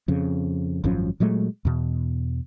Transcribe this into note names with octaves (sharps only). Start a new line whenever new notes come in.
F2 C#3
G#1 F#2 F3 C#4
A#2 F#3 G#3 A3
E2 B2